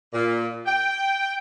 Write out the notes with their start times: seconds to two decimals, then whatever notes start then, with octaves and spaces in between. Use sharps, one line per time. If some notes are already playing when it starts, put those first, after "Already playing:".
0.13 A#2
0.66 G5